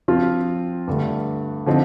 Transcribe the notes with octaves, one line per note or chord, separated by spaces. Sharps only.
F3 C4 F4
G2 D3 A3
D3 F3 C4 D#4